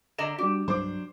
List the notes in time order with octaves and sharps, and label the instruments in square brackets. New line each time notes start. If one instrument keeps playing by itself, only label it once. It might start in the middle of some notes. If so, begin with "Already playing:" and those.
[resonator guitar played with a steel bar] D3 D#5 A#5 [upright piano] E7
[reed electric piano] G3 D4 F#4 [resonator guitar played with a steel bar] G4
[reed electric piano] C2 G2 [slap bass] F#3 D4 [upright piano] C5 D6